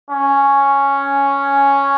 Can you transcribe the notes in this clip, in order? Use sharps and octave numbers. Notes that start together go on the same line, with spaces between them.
C#4